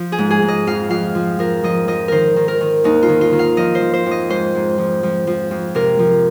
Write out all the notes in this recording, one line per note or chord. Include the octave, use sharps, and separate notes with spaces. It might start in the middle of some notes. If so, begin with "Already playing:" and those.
Already playing: F3
G#4
G#2
G#4
G#2
D#5
F2 F5
F2 F5
F3
F3 A#4
F3 D#5
F3 D#5
D#3 A#4 C5
D#3
A#4
D#3
D#2 D#4
F4
D#3
F4
D#3
F5
F3 D#5
C5
F3
C5
F2
D#5
G#2 C5
G#2
F3
F3
F3
F2
C3 A#4
F3